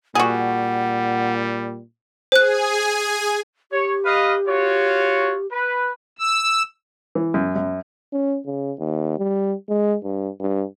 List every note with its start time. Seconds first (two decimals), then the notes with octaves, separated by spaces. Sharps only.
0.15 A#2 G3 F#4 G#4 F#5
2.32 G#4 C5 G#5 F#6
3.71 G4 C#5
4.04 B4 D#5 F5
4.47 F4 F#4 C#5
5.51 B4
6.19 E6
7.15 E3
7.34 F#2
7.56 F#2
8.13 C#4
8.46 C#3
8.79 D#2
9.18 G3
9.69 G#3
10.04 G2
10.40 G2